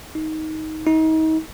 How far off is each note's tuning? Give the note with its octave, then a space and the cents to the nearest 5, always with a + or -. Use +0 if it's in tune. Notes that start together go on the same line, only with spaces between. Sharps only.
D#4 +15
D#4 +35